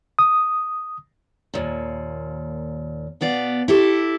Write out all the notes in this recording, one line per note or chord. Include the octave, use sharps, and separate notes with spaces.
D#6
D#2 A#2
B2 B3 D5 F5
E4 G4 A4